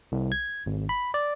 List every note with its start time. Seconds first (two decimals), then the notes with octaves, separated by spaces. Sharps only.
0.12 C2
0.32 G#6
0.66 G#1
0.89 B5
1.14 D5